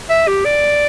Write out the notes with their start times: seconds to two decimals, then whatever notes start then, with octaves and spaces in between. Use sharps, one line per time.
0.09 E5
0.27 G4
0.45 D5